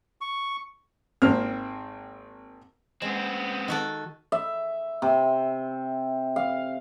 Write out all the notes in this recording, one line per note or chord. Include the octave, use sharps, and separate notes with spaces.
C#6
G#1 A#3 C4 F6
G#3 B3 C4
D#3 F#4 A4
E5
C3
F5